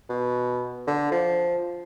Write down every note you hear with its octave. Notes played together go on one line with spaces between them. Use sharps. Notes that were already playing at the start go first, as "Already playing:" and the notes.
B2
D3
F3